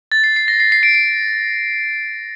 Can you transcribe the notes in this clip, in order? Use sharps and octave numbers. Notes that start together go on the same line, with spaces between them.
A6
C7
C7
A#6
C7
C7
D7
D7